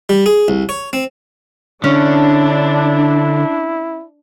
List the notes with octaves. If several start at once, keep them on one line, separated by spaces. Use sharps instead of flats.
G3
G#4
C2
C#5
C4
D3 C#4 D4 E4